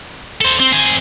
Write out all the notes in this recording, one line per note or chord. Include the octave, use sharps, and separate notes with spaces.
A4 C5
C4
C4 G#4